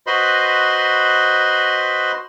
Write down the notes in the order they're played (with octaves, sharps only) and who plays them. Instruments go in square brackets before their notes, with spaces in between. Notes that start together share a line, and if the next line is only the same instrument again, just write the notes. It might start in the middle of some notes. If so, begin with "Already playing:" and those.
[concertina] F#4 B4 C5 D#5 B5 C6